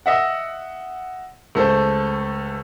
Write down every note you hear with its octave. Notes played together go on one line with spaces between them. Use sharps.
D#5 E5 F#5
C#2 A3 C5